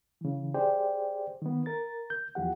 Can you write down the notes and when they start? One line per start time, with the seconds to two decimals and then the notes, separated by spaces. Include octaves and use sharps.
0.21 C#3 E3
0.54 G4 G#4 C5 D5 G5
1.42 D#3 B3
1.66 A#4 A6
2.10 G6
2.35 E2 F3 G4 F#5